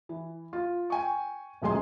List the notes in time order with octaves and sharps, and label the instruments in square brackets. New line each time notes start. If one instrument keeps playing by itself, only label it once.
[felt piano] E3
F4
G5 G#5 C#6
D#1 B1 F#2 G#3 G#5 C6